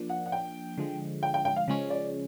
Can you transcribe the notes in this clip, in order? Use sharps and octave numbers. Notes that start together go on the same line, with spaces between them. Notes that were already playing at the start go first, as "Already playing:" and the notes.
Already playing: F3 A#3 D4
F#5
F#5
G5
D3 F3 G#3
G5
G5
G5
F5
C#3 F3 G#3 C#4
D5